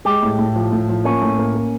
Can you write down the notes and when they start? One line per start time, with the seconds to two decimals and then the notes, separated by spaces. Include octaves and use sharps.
0.05 G#3 G4
0.23 A2
0.39 A2
0.56 F3
0.72 A2
0.89 F3
1.05 A#3 C#4
1.22 A2
1.39 A#3
1.55 A#3